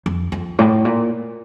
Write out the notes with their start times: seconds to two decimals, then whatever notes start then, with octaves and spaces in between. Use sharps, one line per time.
0.06 F2
0.32 F2
0.59 A2
0.85 A#2